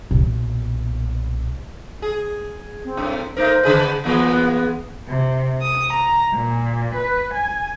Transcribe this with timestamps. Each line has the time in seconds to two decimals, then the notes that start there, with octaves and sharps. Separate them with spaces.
0.11 B1 A#2
2.02 G#4
2.84 C4
2.97 F#2 A2
3.37 A3 D#4 A#4 C5
3.63 C#3 G#4 B4
4.04 E3 G#3 A#3 B3
5.08 C3
5.61 D#6
5.91 A#5
6.34 A#2
6.96 B4
7.35 G#5